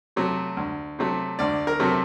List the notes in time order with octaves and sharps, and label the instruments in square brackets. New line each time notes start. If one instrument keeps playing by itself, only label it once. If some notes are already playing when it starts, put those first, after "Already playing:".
[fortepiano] C3 F#3 A3
D2
C3 F#3 A3
D2 D5
A#4
C3 F#3 A3